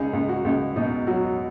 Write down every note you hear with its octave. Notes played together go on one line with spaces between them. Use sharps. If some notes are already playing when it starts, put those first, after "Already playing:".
Already playing: C#2 D#4 G#4
C#2
F#4
C#2
B2 D#4
F#3 F#4